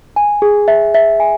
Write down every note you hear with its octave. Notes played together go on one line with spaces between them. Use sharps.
G#5
G#4
E5
E5
G#5